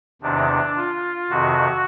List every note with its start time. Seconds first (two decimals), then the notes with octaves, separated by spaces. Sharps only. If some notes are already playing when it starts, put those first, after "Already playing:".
0.22 E2 C3 D#3 D4
0.76 F4
1.30 F2 C3 D#3 F#4